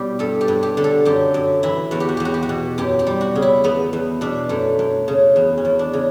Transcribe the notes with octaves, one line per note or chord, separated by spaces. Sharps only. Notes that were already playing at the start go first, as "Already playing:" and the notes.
Already playing: B2 G3 E4 G4
G2 A4
G4
G2
G4
D3
A4
F#2 G4
F#2
E3 E4
E2 F#4
G4
F#4
E2 G4
F#4
G4
F#4
B2
F#2 G4
G4
G3
F#4
C#3
E4
E2 B3
E2
B2 D4
F#2 A3
F#2
C#3
E2
C#4
E2
D4
C#3